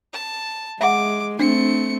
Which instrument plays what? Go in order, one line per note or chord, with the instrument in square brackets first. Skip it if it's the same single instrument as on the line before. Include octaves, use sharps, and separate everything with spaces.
[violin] A5
[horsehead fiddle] G#3 [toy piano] E5 F#5 [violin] D6
[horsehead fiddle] A3 C4 [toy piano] D4 [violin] C#7